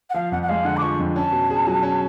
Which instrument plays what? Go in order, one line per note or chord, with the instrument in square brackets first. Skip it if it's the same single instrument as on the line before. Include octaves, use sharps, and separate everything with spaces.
[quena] F#5
[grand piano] F3 [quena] F5
[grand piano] F2 [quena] F#5
[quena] F#5
[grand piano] G#3 [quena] F5
[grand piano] D3 [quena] F#5
[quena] D6
[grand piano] F3 [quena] C#6
[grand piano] F2
[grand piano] C#4 [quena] A5
[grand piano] B2
G#4
F#3
C#4